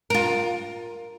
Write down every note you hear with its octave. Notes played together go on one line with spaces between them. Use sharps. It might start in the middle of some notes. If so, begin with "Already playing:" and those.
F4 A#4